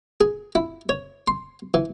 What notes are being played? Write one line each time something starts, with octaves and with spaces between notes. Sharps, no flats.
G#4
E4
C#5
C6
E3